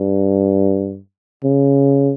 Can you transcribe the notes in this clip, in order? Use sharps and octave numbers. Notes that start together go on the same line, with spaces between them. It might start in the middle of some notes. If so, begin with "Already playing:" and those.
Already playing: G2
C#3